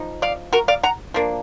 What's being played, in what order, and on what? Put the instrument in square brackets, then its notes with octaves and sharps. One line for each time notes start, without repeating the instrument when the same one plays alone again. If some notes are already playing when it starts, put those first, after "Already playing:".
Already playing: [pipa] F3 D#4
D5 F5
F#4 A#4
D5 F5
F#5 A#5
F3 A#3 D4